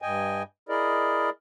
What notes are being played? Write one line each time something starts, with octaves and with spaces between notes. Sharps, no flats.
G2 D#5 G5 G#5
E4 G#4 A#4 D5 D#5